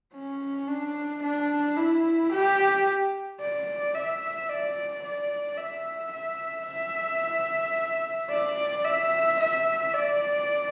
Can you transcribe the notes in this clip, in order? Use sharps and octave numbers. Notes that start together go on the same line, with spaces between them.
C#4
D4
D4
E4
G4
D5
E5
D5
D5
E5
E5
E5
D5
E5
E5
D5